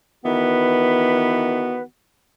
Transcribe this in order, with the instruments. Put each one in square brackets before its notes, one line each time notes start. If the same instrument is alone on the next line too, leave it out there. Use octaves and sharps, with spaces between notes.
[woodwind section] D#3 E3 B3 F#4 B4